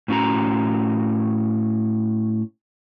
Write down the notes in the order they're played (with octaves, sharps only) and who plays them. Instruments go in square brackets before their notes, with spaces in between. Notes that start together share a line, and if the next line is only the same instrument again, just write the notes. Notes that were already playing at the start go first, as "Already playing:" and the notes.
[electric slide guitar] A2 C#4 F#4 A#5